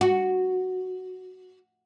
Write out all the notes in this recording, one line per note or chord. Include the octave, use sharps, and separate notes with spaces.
F#4